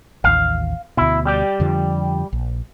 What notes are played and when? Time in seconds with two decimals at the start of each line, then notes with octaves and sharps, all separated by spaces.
0.24 A1 D#2 F5
0.97 D2 B2 E4
1.26 G3 G4 D5
1.60 F2 D3 F3
2.33 A#1